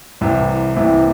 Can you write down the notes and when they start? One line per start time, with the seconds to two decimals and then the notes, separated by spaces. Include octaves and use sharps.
0.21 C2 C3 E3
0.76 C2 C3 E3